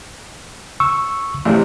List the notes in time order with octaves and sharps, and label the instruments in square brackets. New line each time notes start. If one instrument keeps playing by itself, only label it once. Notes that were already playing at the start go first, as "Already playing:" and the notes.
[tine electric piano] C#6 E6
[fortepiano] A1 C3